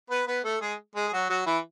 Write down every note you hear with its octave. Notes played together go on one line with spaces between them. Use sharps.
B3 B4
B3 B4
A3 A4
G#3 G#4
G#3 G#4
G#4
F#3 F#4
F#3 F#4
E3 E4